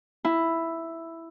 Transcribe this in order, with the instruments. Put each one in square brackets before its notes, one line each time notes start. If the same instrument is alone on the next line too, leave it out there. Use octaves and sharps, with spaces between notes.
[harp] E4